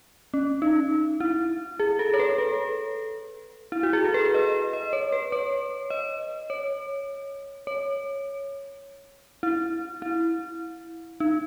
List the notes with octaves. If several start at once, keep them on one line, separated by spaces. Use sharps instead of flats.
C#4
D#4
E4
G#4
A4
C#5
B4
A4
E4
F#4
G#4
A4
B4
D#5
D#5
C#5
B4
C#5
D#5
C#5
C#5
E4
E4
D#4